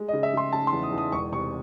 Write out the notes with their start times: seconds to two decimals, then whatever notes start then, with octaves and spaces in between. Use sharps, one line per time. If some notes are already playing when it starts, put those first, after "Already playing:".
Already playing: G#3
0.08 D#5
0.13 C#3
0.23 E5
0.33 C#3 C6
0.53 C#3 A5
0.67 C6
0.72 E2
0.83 D#6
0.92 E2
0.98 D#6
1.12 E1 C#6
1.32 C3 C#6